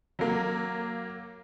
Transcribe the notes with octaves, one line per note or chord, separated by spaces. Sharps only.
F#3 A#3